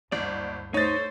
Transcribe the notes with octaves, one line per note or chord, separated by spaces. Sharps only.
F#1 D2 G2 D5
A3 D#4 C5 C#5 A6